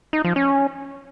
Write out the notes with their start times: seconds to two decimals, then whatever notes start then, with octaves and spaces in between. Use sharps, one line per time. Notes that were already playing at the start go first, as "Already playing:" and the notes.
0.13 D#4
0.25 F3
0.36 C#4